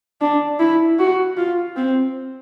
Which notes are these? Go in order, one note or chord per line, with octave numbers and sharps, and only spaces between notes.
D4
E4
F#4
F4
C4